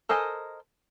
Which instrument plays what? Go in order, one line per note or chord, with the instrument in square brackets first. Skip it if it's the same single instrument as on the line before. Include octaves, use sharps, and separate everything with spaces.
[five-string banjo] A4 A#4 C5 D#5 G#5